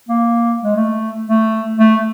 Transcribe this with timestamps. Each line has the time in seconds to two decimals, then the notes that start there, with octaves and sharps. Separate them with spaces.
0.09 A#3
0.63 G#3
0.76 A3
1.28 A3
1.79 A3